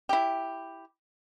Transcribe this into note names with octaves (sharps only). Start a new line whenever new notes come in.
E4 G4